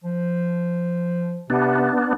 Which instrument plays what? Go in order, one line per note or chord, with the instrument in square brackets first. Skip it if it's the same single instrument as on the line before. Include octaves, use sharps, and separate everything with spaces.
[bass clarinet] F3
[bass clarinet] C3 [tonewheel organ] B3 D4